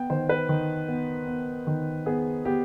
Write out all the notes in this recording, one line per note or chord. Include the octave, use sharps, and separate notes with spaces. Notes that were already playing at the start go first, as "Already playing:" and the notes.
Already playing: B3 G5
D#3 C5
B4
D#3
B3
B3
D#3
B3 G#4
B3 G4